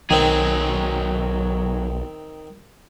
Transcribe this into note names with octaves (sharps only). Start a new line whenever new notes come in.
B1 D#3 F#3 C4 G#4